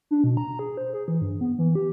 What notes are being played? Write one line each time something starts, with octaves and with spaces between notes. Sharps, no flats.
D4
B2
A#5
G#4
C5
G#4
E3
G2
B3
E3
G4